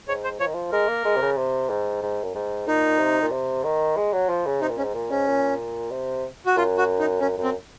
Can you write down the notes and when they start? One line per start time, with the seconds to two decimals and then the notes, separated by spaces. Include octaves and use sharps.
0.08 G#2 C#5
0.24 C5
0.40 F3 C#5
0.47 D#3
0.54 F3
0.72 G#3 A#4
0.89 A#3
1.05 G#3
1.16 C3
1.22 C#3
1.37 C3
1.69 G#2
2.02 G#2
2.23 F#2
2.35 G#2
2.67 A#2 D#4
2.99 C3
3.22 A#2
3.32 C3
3.64 D#3
3.97 G#3
4.13 F#3
4.29 F3
4.46 C#3
4.62 C3 D#4
4.70 A#2
4.77 G#2 C#4
4.94 A#2
5.10 G#2 C#4
5.27 A#2
5.91 C3
6.46 F#4
6.56 F#2 F4
6.78 F#4
6.99 D#4
7.21 F#2 C#4
7.38 F#2
7.43 C4